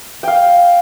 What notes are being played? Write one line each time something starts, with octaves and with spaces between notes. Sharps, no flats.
F5 G5